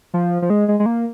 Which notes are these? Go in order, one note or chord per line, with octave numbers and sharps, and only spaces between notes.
F3
F3
G#3
G#3
G#3
A#3